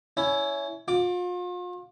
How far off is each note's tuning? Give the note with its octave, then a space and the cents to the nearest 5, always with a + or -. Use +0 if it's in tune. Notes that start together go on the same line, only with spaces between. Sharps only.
C#4 +20 E4 +0
F4 +40 D6 +0